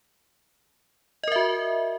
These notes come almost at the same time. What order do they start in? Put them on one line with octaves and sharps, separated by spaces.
D#5 A#4 E5 F#4